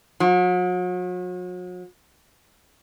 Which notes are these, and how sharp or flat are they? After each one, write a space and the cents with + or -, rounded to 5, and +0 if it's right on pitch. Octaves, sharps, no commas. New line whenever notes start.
F#3 -40